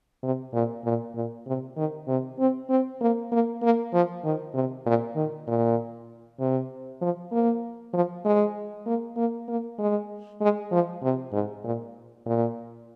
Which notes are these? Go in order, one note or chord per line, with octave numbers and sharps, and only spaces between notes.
C3
A#2
A#2
A#2
C3
D#3
C3
C4
C4
A#3
A#3
A#3
F3
D#3
C3
A#2
D#3
A#2
C3
F3
A#3
F3
G#3
A#3
A#3
A#3
G#3
G#3
F3
C3
G#2
A#2
A#2